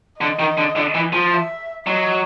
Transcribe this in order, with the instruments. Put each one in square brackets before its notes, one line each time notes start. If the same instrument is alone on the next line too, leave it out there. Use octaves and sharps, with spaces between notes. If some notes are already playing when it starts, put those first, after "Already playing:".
[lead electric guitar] D3 [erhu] D#5
[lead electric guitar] D#3
D3
D3
E3
F3
[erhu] E5
[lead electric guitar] F#3 [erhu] D#5